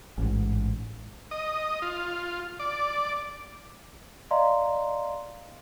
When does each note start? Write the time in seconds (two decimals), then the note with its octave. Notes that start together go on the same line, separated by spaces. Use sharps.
0.18 A1 G#2
1.31 D#5
1.82 F4
2.59 D5
4.31 D5 D#5 F5 A#5 C6